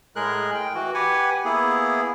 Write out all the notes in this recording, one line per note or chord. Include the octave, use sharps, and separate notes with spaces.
A2 G#3 G#4 A#4 F#6
G5
E3 F#4
G4 B4 F#5 G#5
A#3 B3 E4 G#4